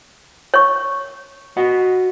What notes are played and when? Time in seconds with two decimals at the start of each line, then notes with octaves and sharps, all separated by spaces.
0.54 C#5 C#6
1.57 F#4 D#5 F#5